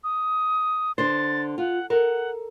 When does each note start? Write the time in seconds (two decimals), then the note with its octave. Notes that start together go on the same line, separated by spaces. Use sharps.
0.04 D#6
0.98 D3 C5 A6
1.58 F4 F#5
1.90 A4 A#4 F#5